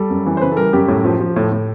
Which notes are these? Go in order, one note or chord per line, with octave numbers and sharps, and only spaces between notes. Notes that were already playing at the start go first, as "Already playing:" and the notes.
Already playing: G3 A4
F#2
E3
C5
C#3 B4
A4
G3 A#4
F#2 G4
A2
F3
F3
A2
A2